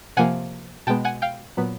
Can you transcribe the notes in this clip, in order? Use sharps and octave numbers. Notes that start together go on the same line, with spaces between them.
C3 F3 A#3 F#5 G#5
B2 G#3 B3 G5 A5
F#5 G#5
F5 G5
A#2 F#3 B3